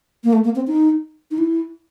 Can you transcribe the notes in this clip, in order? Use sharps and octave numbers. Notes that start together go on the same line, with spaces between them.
A#3
A3
A#3
C4
D#4
D#4
E4